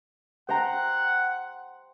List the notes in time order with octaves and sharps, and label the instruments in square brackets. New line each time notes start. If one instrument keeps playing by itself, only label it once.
[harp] C5 G5 A#5 [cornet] F#5